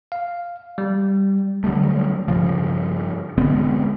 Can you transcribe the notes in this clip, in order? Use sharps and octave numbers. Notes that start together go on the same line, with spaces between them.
F5
G3
D3 F#3 G3 A3
G2 C#3 F3
D3 G#3 B3 C4